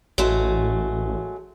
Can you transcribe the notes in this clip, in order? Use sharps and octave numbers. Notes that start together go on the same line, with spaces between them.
A1 F#3 G#3 A3